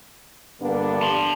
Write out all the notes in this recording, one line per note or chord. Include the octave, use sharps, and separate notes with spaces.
G2 D3 G3 A#3 B3 D4
A5 C6